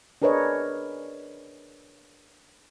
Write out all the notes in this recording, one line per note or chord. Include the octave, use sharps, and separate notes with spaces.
D4 G#4 A#4 B4 C#5 D#5